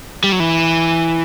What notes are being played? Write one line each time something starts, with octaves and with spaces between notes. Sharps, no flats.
G3
F#3
E3